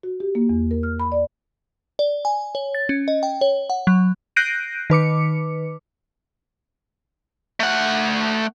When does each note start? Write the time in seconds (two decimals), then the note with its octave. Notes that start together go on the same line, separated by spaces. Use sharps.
0.03 F#4
0.20 G4
0.35 A#3
0.49 E2
0.71 A#4
0.83 F6
1.00 B5
1.12 D5
1.99 D5
2.25 G#5
2.55 C#5
2.75 A6
2.89 C#4
3.08 D#5
3.23 G5
3.41 C#5
3.70 F#5
3.87 F#3
4.36 F#6 G6 A#6 C7 D7 D#7
4.90 D#3 B4 D6 C#7
7.60 A3 F#5